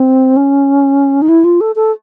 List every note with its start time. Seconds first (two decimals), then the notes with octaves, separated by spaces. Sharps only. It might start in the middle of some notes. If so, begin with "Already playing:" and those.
Already playing: C4
0.36 C#4
1.22 D#4
1.28 E4
1.44 F4
1.60 A4
1.76 A4